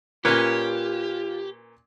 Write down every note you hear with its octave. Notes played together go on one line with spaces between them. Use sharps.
A#2 C#4 F4 G4 A#4 B4 C#5